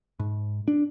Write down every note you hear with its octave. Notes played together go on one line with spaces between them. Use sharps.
G#2
D4